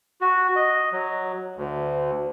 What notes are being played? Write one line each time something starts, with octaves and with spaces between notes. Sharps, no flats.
F#4
D#5
F#3
D2